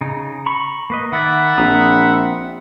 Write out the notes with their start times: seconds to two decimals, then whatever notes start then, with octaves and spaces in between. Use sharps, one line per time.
0.01 C#3 D#4
0.46 A#5 B5 C#6
0.90 A#3 B4 D#5
1.12 D#3 D5 E5 F#5 B5
1.58 A#1 C4 A#5 D#6